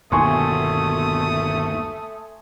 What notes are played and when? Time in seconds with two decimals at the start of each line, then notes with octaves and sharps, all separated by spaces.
0.12 G1 D#2 B2 A3 G#5 C6 C#6 D#6